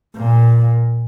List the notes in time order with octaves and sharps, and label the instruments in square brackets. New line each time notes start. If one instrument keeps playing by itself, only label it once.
[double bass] A#2